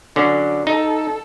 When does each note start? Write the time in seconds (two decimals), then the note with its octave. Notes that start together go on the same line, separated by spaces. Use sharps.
0.16 D3 F#3 C#4
0.67 D#4 A4